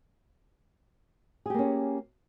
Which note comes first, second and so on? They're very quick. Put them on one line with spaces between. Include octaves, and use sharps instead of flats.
G#4 G4 A#3 C#4